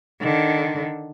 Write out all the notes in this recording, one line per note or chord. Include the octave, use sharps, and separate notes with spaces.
D3 D#3